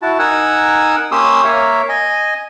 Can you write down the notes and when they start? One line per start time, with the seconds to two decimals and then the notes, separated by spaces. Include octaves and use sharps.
0.02 E4 F#4 A5
0.19 D#4 A#4 F#5 G#5 E6
1.11 A#3 C#4 G4 C6 D#6 E6
1.45 A#3 A#4 C#5 E5 F5
1.89 D#5 G#5